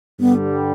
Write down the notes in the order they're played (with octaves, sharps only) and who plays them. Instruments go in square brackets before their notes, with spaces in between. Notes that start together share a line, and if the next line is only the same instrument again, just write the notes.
[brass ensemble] G2 D3 G3 [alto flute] B3